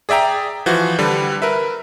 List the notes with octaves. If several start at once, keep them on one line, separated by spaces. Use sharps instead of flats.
G#4 D5 E5 G5 A#5
E3 F3 F#4
D3 G3 B4
A#4 B4 E5